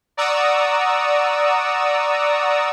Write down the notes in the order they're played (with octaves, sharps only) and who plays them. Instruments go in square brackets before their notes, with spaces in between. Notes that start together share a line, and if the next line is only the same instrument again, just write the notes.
[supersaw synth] D5 F#5 A#5 C#6 D#6 E6